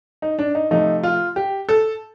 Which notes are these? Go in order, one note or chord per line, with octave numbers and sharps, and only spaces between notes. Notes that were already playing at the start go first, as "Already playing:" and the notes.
D#4
D4
D#4
C3 F3 A3 D#4
F4
G4
A4